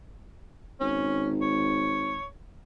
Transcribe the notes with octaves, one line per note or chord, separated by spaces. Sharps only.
G#1 C#4
C#5